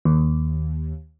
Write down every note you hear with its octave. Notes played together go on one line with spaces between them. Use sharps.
D#2